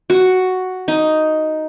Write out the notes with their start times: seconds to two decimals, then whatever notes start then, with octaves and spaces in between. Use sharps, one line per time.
0.10 F#4
0.88 D#4